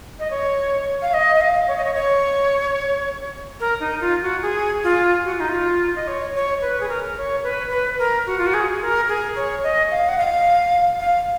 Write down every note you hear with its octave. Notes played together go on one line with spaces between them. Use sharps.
D#5
C#5
F5
D#5
D#5
F5
C#5
D#5
C#5
C#5
A#4
D#4
F4
F#4
G#4
F4
F#4
F4
D#4
F4
D#5
C#5
C#5
B4
G#4
A#4
C#5
B4
B4
A#4
F#4
F4
F#4
G#4
A#4
G#4
C#5
D#5
F5
F#5
F5
F5